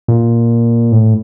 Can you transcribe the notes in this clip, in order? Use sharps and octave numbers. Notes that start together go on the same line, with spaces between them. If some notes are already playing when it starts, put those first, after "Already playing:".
A#2
A2